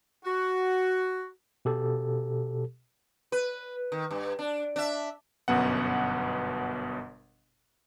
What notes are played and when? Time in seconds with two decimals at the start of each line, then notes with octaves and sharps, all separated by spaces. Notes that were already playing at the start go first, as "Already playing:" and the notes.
0.24 F#4
1.65 B2 G4 A4
3.32 B4
3.92 D#3
4.11 G2
4.39 D4
4.76 D4 E5
5.48 G1 F#2 B2 B3 F#5